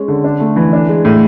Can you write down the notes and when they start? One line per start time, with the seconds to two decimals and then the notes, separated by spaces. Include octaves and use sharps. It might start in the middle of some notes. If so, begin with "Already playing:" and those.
Already playing: G#3 C#4
0.08 D3
0.24 D4
0.40 A3
0.56 E3
0.73 D4
0.89 G#3
1.05 A2